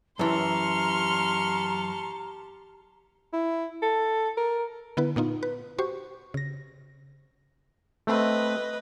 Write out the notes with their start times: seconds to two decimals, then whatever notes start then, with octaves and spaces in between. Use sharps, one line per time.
0.19 F#2 E3 G4 A5 A#5 C6 C#6 F6
3.33 E4
3.82 A4
4.37 A#4
4.97 D3 B3 E4 B4
5.16 A#2 B3 D#4 F4
5.43 B4
5.79 F#4 G4 C5 C#6
6.34 C#3 A#6
8.07 A3 C4 B4 D#5